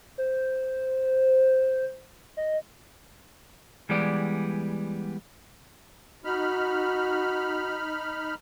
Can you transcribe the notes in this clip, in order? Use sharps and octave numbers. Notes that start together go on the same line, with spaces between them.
C5
D#5
E3 G3 G#3 B3 D5
D#4 F#4 B5 F6